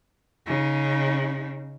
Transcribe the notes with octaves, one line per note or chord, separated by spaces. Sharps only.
C#3 D#4